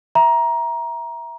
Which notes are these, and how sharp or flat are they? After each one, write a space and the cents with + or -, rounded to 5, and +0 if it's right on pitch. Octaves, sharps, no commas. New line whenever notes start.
E5 +0 A#5 +15